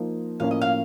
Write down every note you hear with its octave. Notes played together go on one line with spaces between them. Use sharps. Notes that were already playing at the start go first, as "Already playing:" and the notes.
Already playing: F3 A#3 D#4
A2 F3 A#3 C#4 F5
D#5
F5